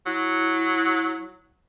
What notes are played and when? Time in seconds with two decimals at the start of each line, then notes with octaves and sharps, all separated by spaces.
0.06 F#3 E4